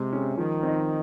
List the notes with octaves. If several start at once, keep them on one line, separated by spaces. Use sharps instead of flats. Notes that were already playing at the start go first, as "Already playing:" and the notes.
Already playing: C3 G#3
C#4 G#4
D#3 F3
C4 D#4